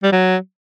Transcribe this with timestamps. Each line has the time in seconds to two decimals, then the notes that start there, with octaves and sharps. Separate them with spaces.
0.03 G3
0.12 F#3